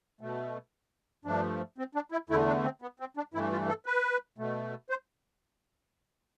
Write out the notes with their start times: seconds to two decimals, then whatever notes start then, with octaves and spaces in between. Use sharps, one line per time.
0.21 B2 A3
1.25 G2 F3 A3 D4
1.78 C4
1.95 D4
2.12 E4
2.29 E2 D3 A3 E4
2.47 D4
2.64 C4
2.82 B3
3.00 C4
3.17 D4
3.34 G2 E3 A3 E4
3.52 F4
3.68 A4
3.86 B4
4.38 B2 A3
4.90 C5